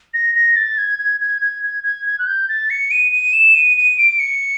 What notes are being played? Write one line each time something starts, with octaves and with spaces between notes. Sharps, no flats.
A#6
A#6
A6
G#6
G#6
G#6
G#6
G#6
G#6
G#6
F#6
G6
A6
C#7
D#7
D#7
E7
D#7
D#7
D7
C#7